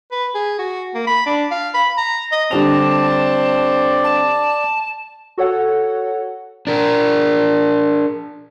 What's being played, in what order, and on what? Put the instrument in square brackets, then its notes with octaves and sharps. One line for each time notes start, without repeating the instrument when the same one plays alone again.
[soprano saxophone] B4
G#4
F#4
A#3
B5
D4
F5
B5
A#5
D#5
[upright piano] D3 G3 F7 [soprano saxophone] C4 [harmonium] D5 [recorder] A5
[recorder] A5
[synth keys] F#4 A4 C#5 F#5
[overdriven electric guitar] D4 A#4